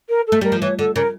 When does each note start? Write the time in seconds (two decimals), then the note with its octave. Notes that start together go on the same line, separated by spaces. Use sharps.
0.09 A#4
0.27 A4
0.32 A3
0.41 G3 A#4
0.52 F3
0.61 E3 C#5
0.79 D3 A4
0.95 C#3 A#4